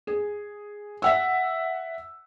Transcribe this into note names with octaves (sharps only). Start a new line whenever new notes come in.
G#4
E5 F#5 E6